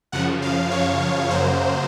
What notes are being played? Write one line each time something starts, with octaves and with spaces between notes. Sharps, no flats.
F#2 C#3 F3 F#5
F5
C#5
F#2 C#3 F#3 A#3 C5